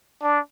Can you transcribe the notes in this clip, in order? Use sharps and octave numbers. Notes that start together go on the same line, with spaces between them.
D4